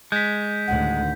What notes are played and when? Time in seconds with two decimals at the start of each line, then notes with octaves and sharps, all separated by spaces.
0.12 G#3 G6 B6
0.67 D2 A2 D#3 F#5